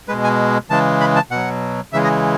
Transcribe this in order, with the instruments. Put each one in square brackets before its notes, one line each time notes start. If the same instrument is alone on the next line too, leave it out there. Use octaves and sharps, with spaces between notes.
[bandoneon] B2 G#3 B4
G#5
C#3 E3 G#3 A5
B5
A5
B2 F#3 F#5
C#3 E3 G#3 E5
D#5